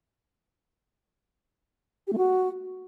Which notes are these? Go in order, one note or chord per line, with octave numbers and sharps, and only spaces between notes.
G4
A3
F#4